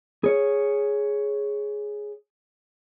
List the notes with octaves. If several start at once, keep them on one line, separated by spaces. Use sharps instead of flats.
G#4 C#5